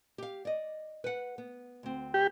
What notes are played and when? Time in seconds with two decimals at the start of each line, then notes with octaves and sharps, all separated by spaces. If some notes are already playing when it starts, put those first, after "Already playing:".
0.18 G4 F5
0.45 D5 D#5
1.04 B4 F#5
1.38 B3
1.83 D2 C4
2.14 G4